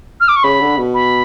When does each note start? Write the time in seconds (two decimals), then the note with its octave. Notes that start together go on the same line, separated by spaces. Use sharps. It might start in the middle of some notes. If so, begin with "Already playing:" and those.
0.21 F6
0.28 D6
0.36 C#6
0.44 C#3 B5
0.61 D3
0.77 B2
0.94 B5